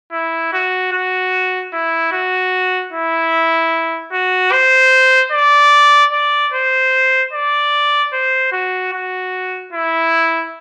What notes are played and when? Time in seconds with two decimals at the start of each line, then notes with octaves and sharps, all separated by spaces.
0.12 E4
0.53 F#4
0.93 F#4
1.73 E4
2.12 F#4
2.93 E4
4.12 F#4
4.52 C5
5.32 D5
6.12 D5
6.53 C5
7.33 D5
8.13 C5
8.52 F#4
8.93 F#4
9.73 E4